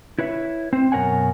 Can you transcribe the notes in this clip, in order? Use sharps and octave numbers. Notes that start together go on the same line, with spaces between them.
E4 B4 C#5 E5
C4 C5
F#2 B2 A#4 C#5 F#5 G#5